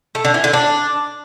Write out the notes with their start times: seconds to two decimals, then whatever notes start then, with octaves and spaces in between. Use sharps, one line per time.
0.15 A3
0.25 D3
0.34 E3
0.44 D3
0.53 D4